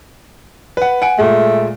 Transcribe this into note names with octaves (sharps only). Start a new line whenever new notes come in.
B4 F#5
F#5 G#5 D7
A#2 G#3 A3